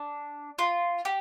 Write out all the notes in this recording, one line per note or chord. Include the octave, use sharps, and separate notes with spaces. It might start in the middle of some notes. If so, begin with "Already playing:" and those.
Already playing: D4
F4
G4